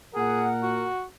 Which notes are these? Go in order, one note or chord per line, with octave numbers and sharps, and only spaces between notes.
A#2 G#4 A#4 F#5
F#4